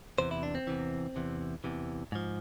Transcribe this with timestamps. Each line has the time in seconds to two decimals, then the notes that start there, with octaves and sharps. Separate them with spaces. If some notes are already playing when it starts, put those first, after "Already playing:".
0.18 E2 C3 E3 C5
0.31 E4
0.43 D4
0.55 C4
0.67 E2 C3 E3
1.16 E2 C3 E3
1.64 E2 C3 E3
2.12 G#2 F3